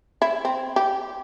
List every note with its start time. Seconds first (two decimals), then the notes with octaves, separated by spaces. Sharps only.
0.22 E4
0.45 C4
0.76 G4